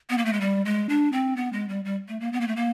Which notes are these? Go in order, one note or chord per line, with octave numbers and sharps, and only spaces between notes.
B3
A#3
A3
G#3
G3
G#3
D4
C4
B3
G#3
G3
G3
A3
A#3
B3
A#3
A3
A#3